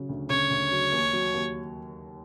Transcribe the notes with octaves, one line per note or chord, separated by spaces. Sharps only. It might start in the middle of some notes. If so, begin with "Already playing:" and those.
Already playing: C#3 F#3
D2
C#3 C#5
D2
F#3
D#2
F#3
D#2